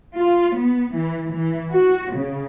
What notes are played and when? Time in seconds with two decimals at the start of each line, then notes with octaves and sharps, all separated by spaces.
0.14 F4
0.58 B3
0.95 E3
1.32 E3
1.71 F#4
2.14 C#3